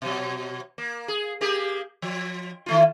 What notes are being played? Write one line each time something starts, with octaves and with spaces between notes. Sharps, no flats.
B2 F#3
A#3
G#4
A#3 G4 G#4
F3
D#3 A3 F4